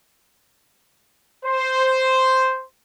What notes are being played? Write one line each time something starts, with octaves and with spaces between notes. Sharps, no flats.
C5